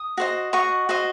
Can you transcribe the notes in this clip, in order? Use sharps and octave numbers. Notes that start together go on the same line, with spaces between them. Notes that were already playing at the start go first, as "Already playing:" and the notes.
Already playing: D#6
F#4 C5 D#5
F#4 C5 D#5 C#6
F#4 C5 D#5